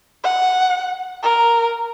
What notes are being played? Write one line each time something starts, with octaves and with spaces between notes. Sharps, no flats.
F#5
A#4